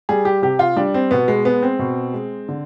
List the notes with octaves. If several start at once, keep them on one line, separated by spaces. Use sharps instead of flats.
G3 G#4
G4
C3 G4
F4
G3 D4
C4
B2 B3
G#3
G#3 B3
C4
B2
G#3
D3